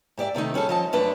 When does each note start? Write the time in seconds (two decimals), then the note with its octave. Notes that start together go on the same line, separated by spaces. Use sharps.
0.18 G#2 G4 D5 E5
0.35 C3 D#3 A3 D#4
0.54 G3 C#4 G#4 A4
0.69 F3 D#5 A5
0.93 F#2 A3 D4 B4